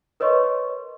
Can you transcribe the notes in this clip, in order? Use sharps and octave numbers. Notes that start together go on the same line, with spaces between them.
A#4 B4 C#5 D#5 C6 C#6